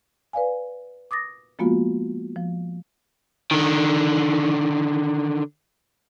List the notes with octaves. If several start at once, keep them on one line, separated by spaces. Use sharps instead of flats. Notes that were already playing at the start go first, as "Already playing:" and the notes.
B4 D5 F5 G#5
D6 D#6 A6 A#6
F3 G#3 A#3 B3 F4 F#4
F3
D3 D#3